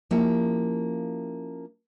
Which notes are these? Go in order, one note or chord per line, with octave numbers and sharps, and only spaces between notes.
F3 A#3 C#4 E4 G4